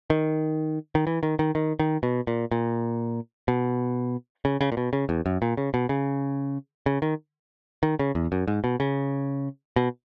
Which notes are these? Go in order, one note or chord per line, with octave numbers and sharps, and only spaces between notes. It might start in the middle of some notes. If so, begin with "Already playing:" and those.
D#3
D#3
E3
D#3
D#3
D#3
D#3
B2
A#2
A#2
B2
C#3
C#3
A#2
B2
C#3
E2
F#2
A#2
C#3
B2
C#3
C#3
D#3
D#3
C#3
E2
F#2
G#2
B2
C#3
B2